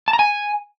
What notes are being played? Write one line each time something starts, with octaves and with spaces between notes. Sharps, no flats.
A5
A#5
G#5